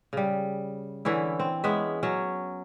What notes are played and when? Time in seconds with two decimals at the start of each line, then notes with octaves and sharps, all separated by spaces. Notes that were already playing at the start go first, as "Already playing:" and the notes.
0.13 C#3 G3
1.05 D3 E3 C#4 E4
1.40 C4
1.64 G#3 B3 C#4 E5
2.03 F#3 C#4